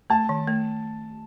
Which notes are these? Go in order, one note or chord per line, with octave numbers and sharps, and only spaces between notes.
A3 A5
D#3
A3